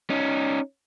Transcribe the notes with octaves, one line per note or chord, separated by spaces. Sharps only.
C#4 D#4